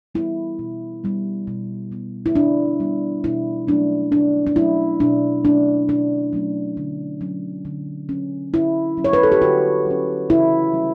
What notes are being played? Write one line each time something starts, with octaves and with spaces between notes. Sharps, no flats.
G3 B3 E4
B2
G3 B3
B2
G3 B3
E4
B2 D4
G3 B3
B2 E4
F#3 A3 C#4 D4
B2 D4
D4
F#3 A3 C#4 E4
B2 D4
F#3 A3 C#4 D4
B2 D4
F#3 A3 C#4
D3
F#3 C#4
D3
F#3 C#4
D3 E4
F#3 C#4
C#5
B4
A4
G4
D3 F#4
F#3 C#4
C#3 E4
G3 C#4